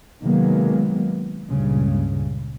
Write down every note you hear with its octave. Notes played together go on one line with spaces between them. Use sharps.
C3 D#3 F#3 G#3 A#3 B3
C#2 G2 A#2 C#3